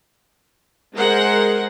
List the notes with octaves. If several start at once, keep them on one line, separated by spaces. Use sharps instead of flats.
G#3 G#4 A#4 C5 F#5